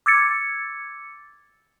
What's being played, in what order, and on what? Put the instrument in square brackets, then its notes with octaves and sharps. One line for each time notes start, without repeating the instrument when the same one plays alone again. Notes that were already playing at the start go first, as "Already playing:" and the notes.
[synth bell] D6 E6 G#6 A6 C#7